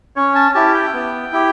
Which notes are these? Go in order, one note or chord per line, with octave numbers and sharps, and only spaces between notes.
C#4 C#5
A5
E4 G4 A5
G5
B3
E4 G4